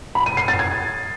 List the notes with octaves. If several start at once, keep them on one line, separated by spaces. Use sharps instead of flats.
B5
D#7
C7
A6
G#6